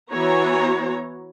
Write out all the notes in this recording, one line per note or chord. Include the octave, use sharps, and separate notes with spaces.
E3 B3 F#4 C#5 A#5